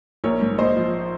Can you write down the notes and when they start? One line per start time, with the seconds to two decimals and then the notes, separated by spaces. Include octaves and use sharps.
0.24 A#1 A#4 C#5
0.41 G#2
0.58 A#1 C5 D#5
0.77 F3